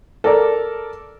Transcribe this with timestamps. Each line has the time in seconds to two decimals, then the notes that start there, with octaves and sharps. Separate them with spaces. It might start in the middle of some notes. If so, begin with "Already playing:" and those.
0.24 A4 A#4 D5 A#5